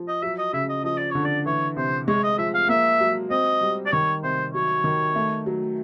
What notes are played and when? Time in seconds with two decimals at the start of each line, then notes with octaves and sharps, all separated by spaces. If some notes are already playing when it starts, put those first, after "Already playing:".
Already playing: F3
0.08 D#5
0.22 F#3 E5
0.38 D#5
0.53 C#3 E5
0.69 D#5
0.84 F3 D#5
0.98 D5
1.11 D3 C#5
1.25 D5
1.46 E3 C#5
1.76 C3 C5
2.08 G#3 C#5
2.23 D#5
2.38 F3 E5
2.54 F5
2.69 A#3 E5
3.01 F#3
3.30 C4 D#5
3.61 G3
3.86 D5
3.92 D#3 C#5
4.23 C3 C5
4.54 F#3 C#5
4.84 D#3
5.16 A3
5.46 F#3